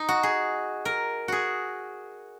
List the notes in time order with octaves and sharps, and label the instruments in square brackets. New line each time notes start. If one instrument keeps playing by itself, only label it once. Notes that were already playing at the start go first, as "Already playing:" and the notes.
Already playing: [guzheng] D#4
F#4
G#4
A#4
F#4 G#4